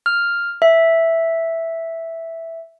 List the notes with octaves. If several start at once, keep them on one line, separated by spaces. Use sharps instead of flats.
F6
E5